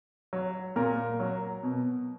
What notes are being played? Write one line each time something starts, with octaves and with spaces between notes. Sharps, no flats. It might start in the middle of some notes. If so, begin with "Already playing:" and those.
F#3
A#2 A#4
F#3
B2